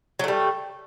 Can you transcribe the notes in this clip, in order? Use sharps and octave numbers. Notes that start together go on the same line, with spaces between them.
F#3 G3 A3